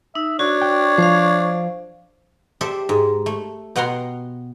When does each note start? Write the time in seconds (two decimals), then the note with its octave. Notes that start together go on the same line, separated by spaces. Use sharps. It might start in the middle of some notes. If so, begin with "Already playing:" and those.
0.15 D#4 E5
0.39 D4 F#4 C#5
0.62 G5
0.98 F3 C5 F5
2.61 G4 A4 C5 D5 E5
2.89 G#2
3.26 A3
3.76 B2 B3 F#5 G5 A#5 C6